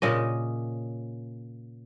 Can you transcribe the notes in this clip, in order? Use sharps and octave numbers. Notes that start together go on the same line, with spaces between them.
A#2 C#3 D#5